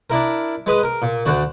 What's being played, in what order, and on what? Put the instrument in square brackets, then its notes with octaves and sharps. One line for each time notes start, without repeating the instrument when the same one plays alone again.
[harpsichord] D4 E4 A#4
G#3 B4 D#6
A#4
A#2
D2 D3 F#4